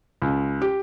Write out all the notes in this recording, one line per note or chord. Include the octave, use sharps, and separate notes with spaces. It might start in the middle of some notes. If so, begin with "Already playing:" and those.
C#2
G4